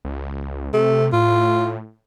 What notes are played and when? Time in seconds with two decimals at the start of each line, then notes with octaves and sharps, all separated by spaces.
0.05 C#2
0.74 C3 A3
1.13 A2 F4